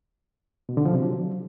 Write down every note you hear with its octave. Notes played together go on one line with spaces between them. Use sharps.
B2
D3
F3
C3
F#3